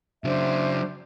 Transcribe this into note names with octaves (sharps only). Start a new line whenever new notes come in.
C#3 F#3 D4 C5 E5